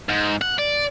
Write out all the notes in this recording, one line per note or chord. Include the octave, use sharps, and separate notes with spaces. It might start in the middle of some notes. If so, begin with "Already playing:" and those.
G#2
F#5
D5